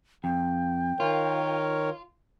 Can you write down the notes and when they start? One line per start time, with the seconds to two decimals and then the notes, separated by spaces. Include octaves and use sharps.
0.24 F2 G5
1.00 D#3 F4 A#4 C#5